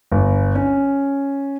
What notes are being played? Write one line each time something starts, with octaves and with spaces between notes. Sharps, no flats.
G1
C#4